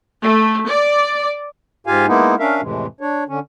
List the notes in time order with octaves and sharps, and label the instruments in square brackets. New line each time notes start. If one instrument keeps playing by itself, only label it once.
[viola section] A3
D5
[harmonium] G#2 F4 G4 F5 G#5
G#3 A#3 B3 D#4 E4
C#4 D4 A#4 E5 F5
F2 A2 C3 E3 G#3
D4 C#5
D3 C#4